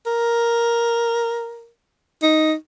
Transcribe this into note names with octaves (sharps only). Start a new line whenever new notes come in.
A#4
D#4